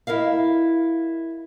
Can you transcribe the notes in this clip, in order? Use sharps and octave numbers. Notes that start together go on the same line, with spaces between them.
E4 A#4 D#5 F5